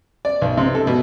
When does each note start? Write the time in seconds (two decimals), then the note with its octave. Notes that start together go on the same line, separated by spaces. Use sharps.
0.25 D5
0.42 B1
0.57 C3
0.75 A4
0.87 B2